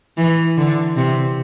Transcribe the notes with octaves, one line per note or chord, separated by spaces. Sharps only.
E3
D3
C3